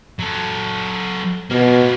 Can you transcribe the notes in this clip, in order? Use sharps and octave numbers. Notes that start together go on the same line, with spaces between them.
F#3 A4
B2 A#3 B3